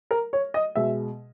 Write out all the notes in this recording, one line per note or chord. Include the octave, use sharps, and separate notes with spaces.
A#4
C#5
D#5
B2 G#3 E5